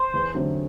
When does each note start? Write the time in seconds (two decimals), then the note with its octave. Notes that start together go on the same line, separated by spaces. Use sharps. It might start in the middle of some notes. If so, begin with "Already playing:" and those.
Already playing: C5
0.14 E2
0.34 D3 F#3 A3 C4